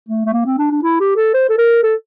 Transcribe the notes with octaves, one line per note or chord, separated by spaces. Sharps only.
A3
A3
A#3
C4
D4
D4
E4
G4
A4
C5
A4
A#4
A4